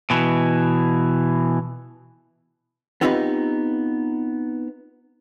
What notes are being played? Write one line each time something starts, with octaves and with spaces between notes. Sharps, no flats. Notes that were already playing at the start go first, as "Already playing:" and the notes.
B2 E3
B3 C4 D#4 F4 G4 B4